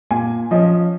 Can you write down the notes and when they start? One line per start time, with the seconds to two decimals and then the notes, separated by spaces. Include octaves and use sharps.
0.11 A#2 G#5
0.51 F3 C#4 D#5